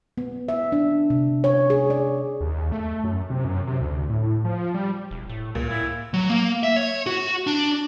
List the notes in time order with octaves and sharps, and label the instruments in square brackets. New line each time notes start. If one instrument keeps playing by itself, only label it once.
[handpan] B3
E5
D4
C3
C#5
G#4
D5
[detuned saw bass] D#2
A3
F#2
C3
F#2
C3
D2
A2
F3
G3
[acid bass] E1
A2
[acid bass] C#2 [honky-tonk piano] A#2
[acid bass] A2 [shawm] E4
[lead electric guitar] F#3
A#3
E5
C#5
F#4
D4